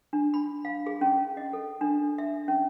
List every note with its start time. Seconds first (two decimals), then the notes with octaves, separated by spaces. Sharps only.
0.13 D4
0.34 B5
0.65 F5
0.86 G#4
1.01 C#4
1.37 D#5
1.53 A4
1.81 D4
2.18 E5
2.48 C#4